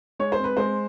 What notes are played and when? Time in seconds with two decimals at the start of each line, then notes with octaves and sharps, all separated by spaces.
0.19 G#3 C#5
0.32 C5
0.39 C4 B4
0.57 G#3 C5